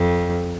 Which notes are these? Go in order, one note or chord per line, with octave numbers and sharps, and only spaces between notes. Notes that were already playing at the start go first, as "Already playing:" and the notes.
Already playing: F2